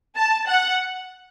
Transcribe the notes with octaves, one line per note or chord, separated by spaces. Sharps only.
A5
F#5